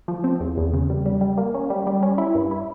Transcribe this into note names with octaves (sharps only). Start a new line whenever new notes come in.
F3
C4
E2
E2
C#3
G3
G3
G3
A#3
C#4
G3
G3
C#4
E4
G2
E4